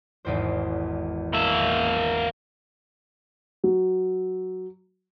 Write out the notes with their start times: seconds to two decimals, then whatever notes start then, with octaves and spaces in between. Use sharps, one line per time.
0.25 G#1 E2 C5
1.34 A#3 E5
3.64 F#3